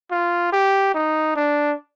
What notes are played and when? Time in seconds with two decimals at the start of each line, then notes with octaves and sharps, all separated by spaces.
0.11 F4
0.52 G4
0.94 D#4
1.36 D4